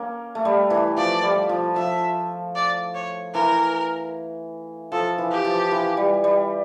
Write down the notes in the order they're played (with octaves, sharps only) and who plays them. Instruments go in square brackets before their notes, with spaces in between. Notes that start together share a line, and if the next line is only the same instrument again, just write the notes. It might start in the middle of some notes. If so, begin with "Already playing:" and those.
Already playing: [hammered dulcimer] A#3 C#4
A3
G3
E3
[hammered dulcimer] F3 [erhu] D5
[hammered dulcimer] G3
F3
[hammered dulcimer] F3 [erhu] E5
[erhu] D5
C#5
[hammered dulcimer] E3 [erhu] A#4
[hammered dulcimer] F3 [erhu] A4
[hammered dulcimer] E3
[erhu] G4
[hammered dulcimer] F3
E3
G3
G3